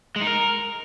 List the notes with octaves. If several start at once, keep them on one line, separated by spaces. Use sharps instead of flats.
G#3
D#4
A#4